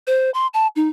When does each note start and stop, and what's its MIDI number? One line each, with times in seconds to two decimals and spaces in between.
0.07 0.30 72
0.34 0.47 84
0.54 0.67 81
0.76 0.89 63